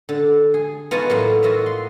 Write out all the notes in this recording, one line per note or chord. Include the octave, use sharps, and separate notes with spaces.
D3
G#4
B3 D#4 F4 F#4 G#5 A5
A2 F#3 A#3
F4 F#4 D#5 E5
C6